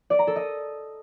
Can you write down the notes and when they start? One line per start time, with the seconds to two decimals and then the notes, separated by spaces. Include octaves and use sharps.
0.10 D5
0.19 A#5
0.27 A4
0.36 D#5